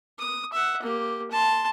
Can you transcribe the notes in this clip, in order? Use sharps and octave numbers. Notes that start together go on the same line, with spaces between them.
D#6
E5 F#5
A#3 G4
A5 C6